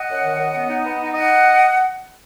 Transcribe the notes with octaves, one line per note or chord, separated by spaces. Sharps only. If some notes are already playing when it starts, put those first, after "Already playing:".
Already playing: D#5 F#5
F#2
D#3
F#2
B3
D#4
B3
D#4
D#5 F#5